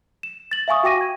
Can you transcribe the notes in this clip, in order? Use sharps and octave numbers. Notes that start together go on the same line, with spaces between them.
E7
A6 F#7
E5 F5 G#5 C#6 D#6
F#4 G5 D6 A#6 D#7
G#6